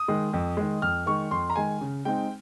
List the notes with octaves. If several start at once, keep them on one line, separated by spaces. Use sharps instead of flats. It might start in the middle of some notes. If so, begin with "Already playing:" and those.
Already playing: D#6
D#3 G#3
F2
D#3 G#3
F2 F6
D#3 G#3 C#6
F2 C6
A#5
D#3 G#3 G#5
C#3
G#3 C4 D#4 G5